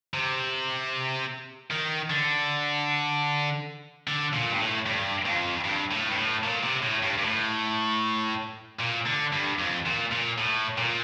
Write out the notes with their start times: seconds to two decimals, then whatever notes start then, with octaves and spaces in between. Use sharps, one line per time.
0.14 C3
1.71 D#3
2.10 D3
4.07 D3
4.33 A#2
4.52 G2
4.60 A2
4.86 G2
5.26 F2
5.65 G2
5.91 A2
6.09 G2
6.18 A2
6.44 A#2
6.64 C3
6.83 A2
7.03 G2
7.18 G2
7.23 A2
8.80 A#2
9.07 D3
9.33 G2
9.59 F2
9.85 A#2
10.11 A#2
10.38 A2
10.78 A#2